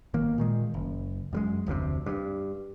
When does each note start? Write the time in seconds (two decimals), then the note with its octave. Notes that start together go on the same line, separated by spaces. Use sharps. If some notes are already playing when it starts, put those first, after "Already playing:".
0.14 G1 D#3 A#3
0.38 A#2 D#3 G#3
0.74 F#1
1.33 F#2 G3 G#3
1.66 F1 D2 A2 C3
2.06 G2